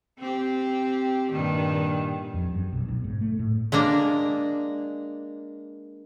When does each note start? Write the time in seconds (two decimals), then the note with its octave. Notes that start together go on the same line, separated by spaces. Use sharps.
0.19 C4 G4
1.31 G2 A#2 D#3
2.34 F2
2.52 F#2
2.73 B1
2.88 B1
3.04 G#2
3.21 A3
3.39 A2
3.72 G#3 A#3 D4 A#5